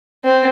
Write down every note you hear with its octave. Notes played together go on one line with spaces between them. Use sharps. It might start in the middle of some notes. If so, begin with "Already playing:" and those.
C4